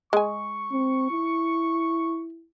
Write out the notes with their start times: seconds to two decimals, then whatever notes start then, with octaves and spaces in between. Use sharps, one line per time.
0.13 G#3 G#5 C#6
0.72 C4
1.12 E4